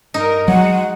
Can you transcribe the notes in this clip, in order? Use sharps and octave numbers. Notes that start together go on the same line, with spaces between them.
G2 D#4 A#4
F#3 G#3 F#4 F#5